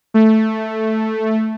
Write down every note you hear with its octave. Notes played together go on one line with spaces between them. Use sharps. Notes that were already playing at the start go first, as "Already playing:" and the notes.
A3